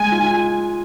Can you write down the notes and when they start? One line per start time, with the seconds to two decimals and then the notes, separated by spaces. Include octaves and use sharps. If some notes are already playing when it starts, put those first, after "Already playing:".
Already playing: G#3 G#5
0.12 F4